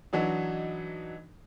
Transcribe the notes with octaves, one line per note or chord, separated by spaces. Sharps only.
E3 F#3 D4 D#4